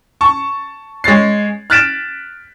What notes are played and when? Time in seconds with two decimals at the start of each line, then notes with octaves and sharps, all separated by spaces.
0.21 A5 C#6
1.04 G#3 C#5 A6 C7
1.70 F6 F#6 A6 B6 D7 E7